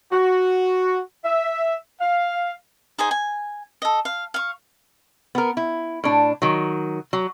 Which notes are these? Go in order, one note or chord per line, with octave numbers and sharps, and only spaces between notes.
F#4
E5
F5
D#4 G#4 C5 G#5
G#5
A4 D#5
F5
F5 C#6
B3 A#4
E4
A2 D4
D#3 F#3
F#3